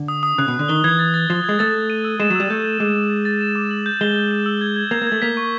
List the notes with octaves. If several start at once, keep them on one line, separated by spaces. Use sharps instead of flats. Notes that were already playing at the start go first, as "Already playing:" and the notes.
Already playing: D3
D#6
D#6
C#3 F#6
B2
F#6
D3
D#3 G7
E3 G#6
A6
A6
F3 G#6
G#3 G#6
A3 A6
A6
D#7
E6
G#3 E7
F#3
G3 E6
A3 G6
G6
G#3 D6
D6
A6
A6
E7
D6
F#7
G6
G#3 G7
G6
E7
E6
G#6
G#6
A#3 G#6
A#3
A3 G#6
A#3 B6
C#6